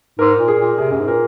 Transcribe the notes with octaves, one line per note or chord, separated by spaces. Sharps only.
G#2 A#4
A#2
G#4
A#2
C3 G#4
F#2
G#2
A#2 A#4